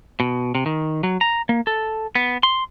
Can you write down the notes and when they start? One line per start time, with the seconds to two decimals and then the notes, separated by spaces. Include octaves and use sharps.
0.20 B2
0.55 C3
0.66 D#3
1.03 F#3
1.21 A#5
1.49 A#3
1.67 A4
2.15 B3
2.43 C6